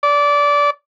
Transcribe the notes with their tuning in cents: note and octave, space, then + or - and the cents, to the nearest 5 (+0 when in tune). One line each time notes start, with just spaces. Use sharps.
D5 -20